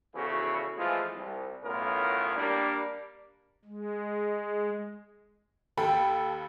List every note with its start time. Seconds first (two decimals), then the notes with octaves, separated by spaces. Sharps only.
0.15 E2 C#3 E3 F3 F#4 A4
0.78 E3 F3 G#3 A3 F4
1.16 C2
1.64 B1 A2 B3 C#4 F4 A#4
2.37 G3 A#3 D4
3.65 G#3
5.77 D#2 A4 G5 B5